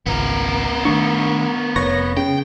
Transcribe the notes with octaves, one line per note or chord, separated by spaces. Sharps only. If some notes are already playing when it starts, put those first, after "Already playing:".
G#1 C#2 B3 A#4
D#3 A3 D4 C#6
F1 B4 C#5 A#6
C#3 G5